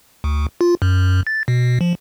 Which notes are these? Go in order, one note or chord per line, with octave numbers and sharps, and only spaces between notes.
D2
F4
F#2
A6
B2
F3